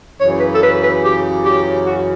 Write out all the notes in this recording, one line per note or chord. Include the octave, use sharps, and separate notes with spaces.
F#2 C#3 E3 C#5
B4
A4
B4
B4
G4
G4
F#4